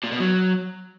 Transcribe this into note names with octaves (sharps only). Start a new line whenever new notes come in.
A#2
B2
F#3